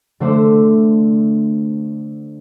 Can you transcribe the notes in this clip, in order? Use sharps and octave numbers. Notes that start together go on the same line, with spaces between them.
D3 A3 C5 E5 F#5 D6